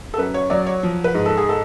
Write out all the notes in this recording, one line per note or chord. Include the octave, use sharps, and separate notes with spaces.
A4
F#2 B4
C#5
F#3 D5
C#5
F3
B4
G#2
A4
G#4
A4